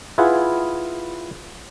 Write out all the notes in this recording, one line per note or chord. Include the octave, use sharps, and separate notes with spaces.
E4 F4 G#4 B4 F#5